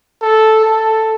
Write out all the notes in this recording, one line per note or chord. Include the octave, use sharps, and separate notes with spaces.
A4
A4